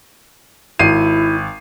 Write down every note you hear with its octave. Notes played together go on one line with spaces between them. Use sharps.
G#1 E4 C7 D#7